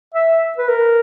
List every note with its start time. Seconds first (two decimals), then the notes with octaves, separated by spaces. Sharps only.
0.14 E5
0.58 B4
0.69 A#4